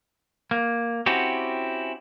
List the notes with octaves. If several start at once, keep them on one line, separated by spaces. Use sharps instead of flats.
A#3
C4 C#4 E4 F#4 G4